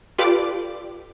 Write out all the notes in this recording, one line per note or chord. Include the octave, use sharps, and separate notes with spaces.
F4 G4 A4 B4 D5 D6